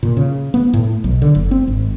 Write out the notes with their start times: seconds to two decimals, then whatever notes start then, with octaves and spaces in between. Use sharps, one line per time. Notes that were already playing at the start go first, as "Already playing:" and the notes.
0.03 A#2
0.17 C#3
0.54 B3
0.74 A2
1.04 B1
1.22 D3
1.35 F#1
1.51 C4
1.68 G#1